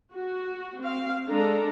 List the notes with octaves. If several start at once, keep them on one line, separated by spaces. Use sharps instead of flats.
F#4
C4 F5
G#3 D4 A4 A#5